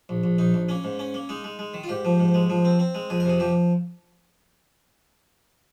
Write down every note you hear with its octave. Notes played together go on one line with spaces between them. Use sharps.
A#1
A#1
A#1 D#4
A#1
A#3 C#4
G#2
C#4
A#3
G#3 D#4
G#3
G#3
D#3
F4
G#2 G4
F3
G#2
G#3
F3
C4
C4
G#3
F2 G#4
A#4
C3 G#4
F3 G4